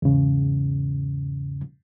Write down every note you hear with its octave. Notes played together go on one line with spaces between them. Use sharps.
E2 G#2 C#3